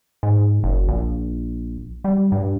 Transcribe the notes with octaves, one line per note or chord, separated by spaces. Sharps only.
G#2
F#1
A#1
G3
G2